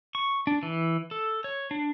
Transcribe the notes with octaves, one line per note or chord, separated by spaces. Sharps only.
C#6
D4
E3
A4
C#5
D4